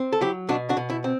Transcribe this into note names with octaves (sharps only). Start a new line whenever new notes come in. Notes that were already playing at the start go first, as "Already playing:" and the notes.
Already playing: C4
A4
F#3 E4 G4
B2 D4 F#4
D4 F#4
B2
E4
C4